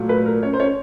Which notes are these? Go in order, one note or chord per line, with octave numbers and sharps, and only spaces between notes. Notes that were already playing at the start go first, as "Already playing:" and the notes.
Already playing: A#2 F#3 A3
B4
A#4
C#4 C#5
C5
C#4 C#5